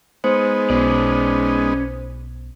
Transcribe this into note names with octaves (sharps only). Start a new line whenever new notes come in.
G#3 B3 D#4 C5
B1 B2 C#4 D5